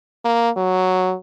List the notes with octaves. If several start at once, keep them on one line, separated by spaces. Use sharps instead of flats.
A#3
F#3